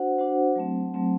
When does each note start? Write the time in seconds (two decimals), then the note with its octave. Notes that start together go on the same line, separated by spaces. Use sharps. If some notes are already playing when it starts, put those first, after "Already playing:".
Already playing: D4 F#4 C5 F#5
0.18 D4 F#4 C5 F#5
0.56 F#3 A3 C4
0.94 F#3 A3 C4